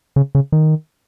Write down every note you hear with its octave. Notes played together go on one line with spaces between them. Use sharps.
C#3
C#3
D#3